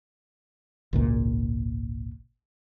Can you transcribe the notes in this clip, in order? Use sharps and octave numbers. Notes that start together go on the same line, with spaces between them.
G#1 C#2 A#2